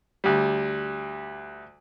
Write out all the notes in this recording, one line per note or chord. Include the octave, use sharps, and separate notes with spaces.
D2 G3